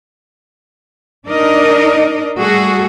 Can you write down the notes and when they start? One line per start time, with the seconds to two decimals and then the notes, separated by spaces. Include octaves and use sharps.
1.27 D4 D#4 A#4 D5 D#5
2.38 G3 A3 F#4 G#4 A4